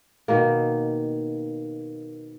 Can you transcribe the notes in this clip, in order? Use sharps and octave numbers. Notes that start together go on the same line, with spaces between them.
B2 D#3 A#3